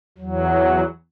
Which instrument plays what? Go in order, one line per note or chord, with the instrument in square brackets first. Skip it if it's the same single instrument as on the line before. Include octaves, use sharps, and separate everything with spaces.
[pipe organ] E2 F#3